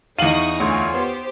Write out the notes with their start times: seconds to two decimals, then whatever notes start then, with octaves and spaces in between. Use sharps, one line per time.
0.19 E2 D#4 F5 C#6 D#6 D#7 F#7
0.60 D2 F4 C#5 G#5 C#6
0.94 B3 G4 C5